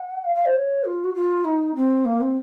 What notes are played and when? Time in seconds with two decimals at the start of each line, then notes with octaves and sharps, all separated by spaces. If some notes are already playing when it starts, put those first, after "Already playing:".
Already playing: F#5
0.25 F5
0.35 F5
0.45 C5
0.56 C#5
0.85 F4
1.04 F#4
1.15 F4
1.45 D#4
1.75 C4
2.05 A#3
2.21 C4